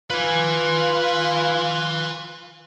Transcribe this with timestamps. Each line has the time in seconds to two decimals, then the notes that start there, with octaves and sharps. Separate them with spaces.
0.10 F4 B4 G#5